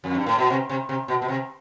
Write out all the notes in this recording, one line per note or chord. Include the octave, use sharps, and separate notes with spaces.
F2
G2
A2
B2
C3
C3
C3
B2
B2
C3